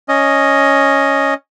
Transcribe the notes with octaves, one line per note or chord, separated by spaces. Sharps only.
C#4 D#5